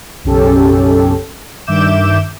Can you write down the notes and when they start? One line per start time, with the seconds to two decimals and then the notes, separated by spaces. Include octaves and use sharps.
0.24 B1 F#2 C#3 C#4 G4 A4
1.67 G2 D#3 E5 D6 G6 E7